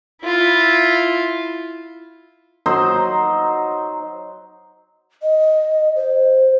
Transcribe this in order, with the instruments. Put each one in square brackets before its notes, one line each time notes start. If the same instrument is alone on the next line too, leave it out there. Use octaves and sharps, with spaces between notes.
[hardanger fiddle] E4 F4
[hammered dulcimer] F#3 D#4 C5
[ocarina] D#5
C5